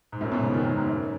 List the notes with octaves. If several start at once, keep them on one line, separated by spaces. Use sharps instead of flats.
G#2
F#2 A2
G#2 B2
A2 C#3
B2 D#3
G#2 B2
G#2
F#2